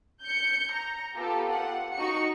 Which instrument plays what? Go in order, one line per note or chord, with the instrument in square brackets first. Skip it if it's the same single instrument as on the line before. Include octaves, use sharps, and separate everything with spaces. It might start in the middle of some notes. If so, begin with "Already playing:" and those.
[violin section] G6 C#7
A#5
B3 F4 G4 A4
F#5
D#4 F#4 C#6 C#7